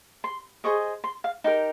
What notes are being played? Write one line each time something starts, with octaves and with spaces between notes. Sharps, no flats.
C6
G#4 C5 D#5 C#6
C6
F5
D#4 G4 A#4